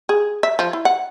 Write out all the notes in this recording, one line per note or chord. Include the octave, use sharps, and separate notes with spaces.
G#4
E5
F3
E4
F#5